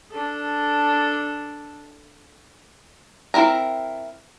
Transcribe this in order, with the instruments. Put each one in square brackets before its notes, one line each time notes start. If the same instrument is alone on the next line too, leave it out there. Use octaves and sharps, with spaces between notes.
[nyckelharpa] D4 A4
[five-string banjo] C4 E4 A#4 A#5